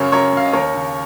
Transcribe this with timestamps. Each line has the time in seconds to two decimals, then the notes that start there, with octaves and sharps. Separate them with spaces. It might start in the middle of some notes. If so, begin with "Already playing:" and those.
Already playing: F#2 C#3 A#4 C#5
0.12 F#2 A#4 C#5
0.33 C#3 F5
0.46 D#5
0.53 D#2 A#4 C#5
0.74 C#3